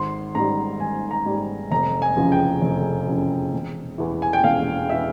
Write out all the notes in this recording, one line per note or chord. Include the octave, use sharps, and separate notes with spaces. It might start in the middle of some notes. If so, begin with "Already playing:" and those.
Already playing: G#1 C6
G#2 G3 A#5
G#1 G#5
A#5
G#2 G3
F1 A#5
G#5
E2 C#3 F3
G5
F1
E2 C#3 F3
E1
E2 E3
G#5
G5
E1 F5
E3 E5